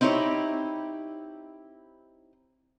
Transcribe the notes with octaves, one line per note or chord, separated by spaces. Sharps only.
C4 D#4 E4 G4 C#5